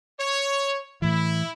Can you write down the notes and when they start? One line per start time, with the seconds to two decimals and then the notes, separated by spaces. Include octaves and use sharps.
0.19 C#5
1.02 A2 E3 E4